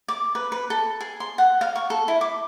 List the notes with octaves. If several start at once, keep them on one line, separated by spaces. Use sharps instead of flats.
D6
B4
B4
A4
G#4
C6
F#5
F5
C#6
A4
E4
D6